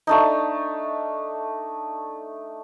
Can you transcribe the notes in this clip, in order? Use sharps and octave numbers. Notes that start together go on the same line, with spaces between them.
A3 D4 D#4